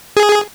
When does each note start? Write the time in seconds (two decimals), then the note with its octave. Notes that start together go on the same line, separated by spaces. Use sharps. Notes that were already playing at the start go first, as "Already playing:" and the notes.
0.17 G#4